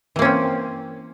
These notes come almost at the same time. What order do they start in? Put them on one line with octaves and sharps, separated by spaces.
E3 A#3 C#4 C4